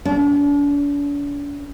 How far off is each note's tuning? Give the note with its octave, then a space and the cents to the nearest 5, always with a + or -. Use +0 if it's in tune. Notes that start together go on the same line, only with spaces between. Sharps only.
D4 -40